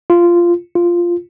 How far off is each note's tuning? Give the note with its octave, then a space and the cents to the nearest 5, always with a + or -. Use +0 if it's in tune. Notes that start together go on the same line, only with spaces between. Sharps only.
F4 -10
F4 -5